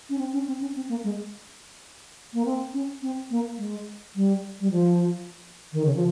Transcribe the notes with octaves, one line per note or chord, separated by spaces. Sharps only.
C#4
C4
C#4
C4
C#4
C4
A#3
G#3
A#3
C4
C#4
C4
A#3
G#3
G3
G3
F3
D#3
C#3
F3